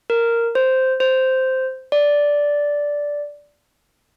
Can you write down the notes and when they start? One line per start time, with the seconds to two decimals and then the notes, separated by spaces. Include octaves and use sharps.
0.10 A#4
0.55 C5
1.00 C5
1.92 D5